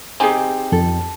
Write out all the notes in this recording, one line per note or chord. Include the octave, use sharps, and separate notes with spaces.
C4 D#4 G4 G#4 G#5
F2 A4